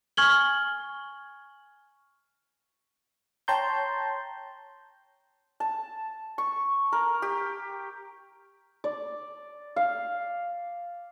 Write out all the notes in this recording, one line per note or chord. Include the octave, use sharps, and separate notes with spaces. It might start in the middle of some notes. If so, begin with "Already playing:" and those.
G#5 C#6 F6 G#6 F#7 G7
C#5 G5 A5 A#5 C6 G6
A5
C#6
A#4
G4
D5
F5